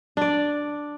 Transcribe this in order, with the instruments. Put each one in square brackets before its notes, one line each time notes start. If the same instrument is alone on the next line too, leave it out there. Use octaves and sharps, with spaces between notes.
[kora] D4 D5